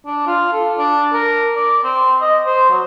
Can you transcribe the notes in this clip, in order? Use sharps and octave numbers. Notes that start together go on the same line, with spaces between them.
D4
F4
A4
D4
A#4
D5
C4
D#5
C5
F#3